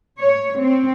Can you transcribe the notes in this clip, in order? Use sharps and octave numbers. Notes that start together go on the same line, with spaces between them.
C#5
C4